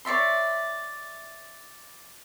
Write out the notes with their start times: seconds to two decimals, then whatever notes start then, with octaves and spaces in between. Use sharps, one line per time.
0.05 C#5 D5 E5 C6